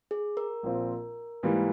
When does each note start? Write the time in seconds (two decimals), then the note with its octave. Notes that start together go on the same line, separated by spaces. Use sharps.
0.11 G#4
0.37 A#4
0.63 A#1 A#2 F3 C4 F4
1.43 G#2 E3 G3 A#3